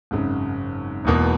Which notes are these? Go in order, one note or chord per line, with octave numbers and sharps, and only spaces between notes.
G#1 F#2 C#3
E1 E2 B2 A#3